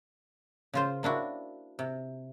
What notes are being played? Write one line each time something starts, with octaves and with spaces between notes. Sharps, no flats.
C#3 F4 C5
A#3 D4 E4 F#4
C3